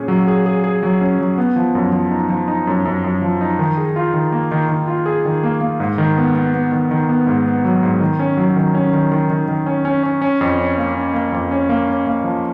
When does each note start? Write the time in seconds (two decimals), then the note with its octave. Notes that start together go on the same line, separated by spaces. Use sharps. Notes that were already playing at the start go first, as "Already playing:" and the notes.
Already playing: A#2 C#4 G#4
0.08 F#3
0.28 G#4
0.46 G#4
0.64 G#4
0.83 F#3
1.01 C#4
1.19 F#3
1.38 B3
1.56 F3
1.75 F#2
1.92 F3
2.11 D#4
2.29 F3
2.48 D#4
2.67 F#2
2.85 F#2
3.04 F#2
3.22 F3
3.41 D#4
3.59 D#3
3.78 G#4
3.96 F4
4.14 D#3
4.32 A#3
4.52 D#3
4.69 D#3
4.88 F4
5.06 G#4
5.25 D#3
5.43 A#3
5.61 A#3
5.80 G#2
5.98 D#3
6.17 B3
6.35 B3
6.54 B3
6.72 D#3
6.91 D#3
7.09 B3
7.27 G#2
7.46 B3
7.65 F#3
7.83 G#2
8.00 D#3
8.19 C#4
8.37 F#3
8.56 D#3
8.75 C#4
8.93 D#3
9.12 D#3
9.30 D#3
9.48 D#3
9.66 C#4
9.85 C#4
10.03 C#4
10.22 C#4
10.41 F2
10.59 C#4
10.77 A#3
10.95 C#4
11.14 A#3
11.32 F2
11.51 C#4
11.69 A#3
11.88 C#4
12.07 A#3
12.24 F3